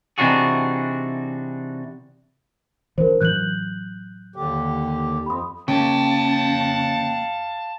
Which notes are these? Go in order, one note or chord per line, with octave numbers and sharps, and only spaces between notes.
C3 E3 D4 D#4 F#4 G#4
E3 D4 A#4 C5
A2 E3 F#3 F#6 G6 F#7
D#2 D3 G4
F2 B5 C6 D#6
C#3 A#3 C#4 D#5 F5 G5 A5